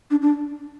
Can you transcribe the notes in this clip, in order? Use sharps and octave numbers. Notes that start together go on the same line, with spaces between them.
D4
D4